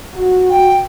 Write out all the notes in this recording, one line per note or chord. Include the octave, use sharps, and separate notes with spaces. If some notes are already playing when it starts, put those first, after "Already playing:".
F#4
G5